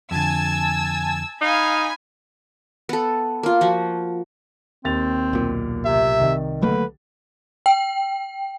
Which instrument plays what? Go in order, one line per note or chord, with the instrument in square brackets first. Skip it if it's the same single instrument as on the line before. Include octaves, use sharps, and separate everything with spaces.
[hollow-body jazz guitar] F2 D3 [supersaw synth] G#5 A5 G#6 [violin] E6
[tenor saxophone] D#4 [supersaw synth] F5 [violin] G#5 B5
[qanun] B3 A4
A#3 F4
F3 F#4
[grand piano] D#2 A6 F7 [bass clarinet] C4
[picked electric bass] B1 A#2
[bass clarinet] C3 [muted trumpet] E5
[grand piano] C2 D#3
[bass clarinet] D3 [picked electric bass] F#3 A3 A#3 [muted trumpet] B4
[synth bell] G5